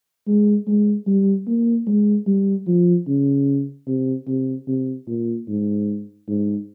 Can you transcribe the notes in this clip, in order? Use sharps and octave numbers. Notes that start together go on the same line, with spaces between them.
G#3
G#3
G3
A#3
G#3
G3
F3
C#3
C3
C3
C3
A#2
G#2
G#2